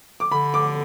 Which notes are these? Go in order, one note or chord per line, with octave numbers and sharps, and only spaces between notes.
D6
D3 B5
D6